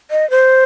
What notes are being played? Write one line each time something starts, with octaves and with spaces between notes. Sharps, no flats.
D#5
C5